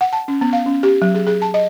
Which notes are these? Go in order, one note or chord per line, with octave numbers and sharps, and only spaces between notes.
F#5
A5
C#4
B3
F5
C#4
G4
F#3
G#4
G#4
A5
D#5